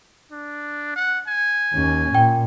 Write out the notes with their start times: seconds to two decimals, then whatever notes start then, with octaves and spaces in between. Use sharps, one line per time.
0.32 D4
0.96 F#5
1.28 G#5
1.73 D#2 C#4
2.15 A#2 G5